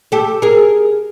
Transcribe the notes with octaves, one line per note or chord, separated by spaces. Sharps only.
G4 A4
G#4 A#4